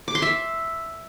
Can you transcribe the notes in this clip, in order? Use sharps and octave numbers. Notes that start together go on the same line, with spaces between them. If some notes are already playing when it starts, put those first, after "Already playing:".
D6
C6
E5